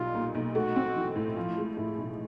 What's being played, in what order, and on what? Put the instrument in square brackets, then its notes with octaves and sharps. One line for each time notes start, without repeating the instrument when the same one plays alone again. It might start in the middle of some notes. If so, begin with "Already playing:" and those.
Already playing: [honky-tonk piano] B1 G3 [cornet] F4
[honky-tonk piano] A#2
B1
[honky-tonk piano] A3 [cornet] F#4
[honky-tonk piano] C4
E3
A2
[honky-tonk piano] F3 [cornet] F4
[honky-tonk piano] G#3
[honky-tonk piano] A2 [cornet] E4
[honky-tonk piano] B1